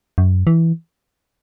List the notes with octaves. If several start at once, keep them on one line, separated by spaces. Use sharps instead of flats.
F#2
E3